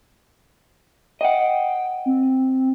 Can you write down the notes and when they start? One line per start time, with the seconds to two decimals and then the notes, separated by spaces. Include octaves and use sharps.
1.21 D#5 F#5 G5
2.06 C4